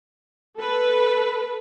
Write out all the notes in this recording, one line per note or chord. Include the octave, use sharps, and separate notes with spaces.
A4 B4